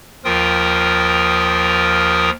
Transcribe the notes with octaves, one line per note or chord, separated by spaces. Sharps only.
D#2 F3 F4 A#4 G5 D#6